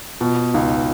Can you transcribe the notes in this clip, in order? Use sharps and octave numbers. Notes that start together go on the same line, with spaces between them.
B2 F4
C#2 D#4